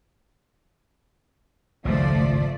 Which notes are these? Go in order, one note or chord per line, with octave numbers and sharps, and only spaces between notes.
G#1 C#2 F#2 F3 A3 D5